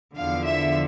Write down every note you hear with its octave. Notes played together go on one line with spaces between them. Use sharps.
E2 D3 F3 F5
E5